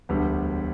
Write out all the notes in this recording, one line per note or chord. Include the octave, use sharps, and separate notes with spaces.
E1 D2 D3 G3 B3